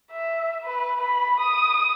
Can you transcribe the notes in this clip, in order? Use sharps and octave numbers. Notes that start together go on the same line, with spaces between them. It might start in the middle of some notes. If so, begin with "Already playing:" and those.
E5
B4
B5
D#6